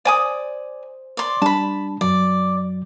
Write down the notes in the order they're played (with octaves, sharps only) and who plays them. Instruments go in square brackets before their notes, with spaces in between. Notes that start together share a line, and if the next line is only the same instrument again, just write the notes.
[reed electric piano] C5 [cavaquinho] D5 G#5 D#6
[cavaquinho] D5 C6
[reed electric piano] G3 D4 [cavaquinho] A5 B5
[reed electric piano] F#2 F#3 [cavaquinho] D5